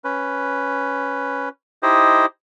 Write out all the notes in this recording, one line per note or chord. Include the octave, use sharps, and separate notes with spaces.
C#4 B4
D#4 E4 G4 C5 D#5